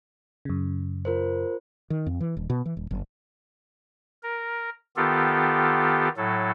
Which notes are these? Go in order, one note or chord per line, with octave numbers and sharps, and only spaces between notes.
F#2 C#3
F4 A#4 C5
D#3
F2
E3
D#1
B2
E3
D#1
F#1
A#4
D#3 B3 F4 G4 A4
A2 F#3 A4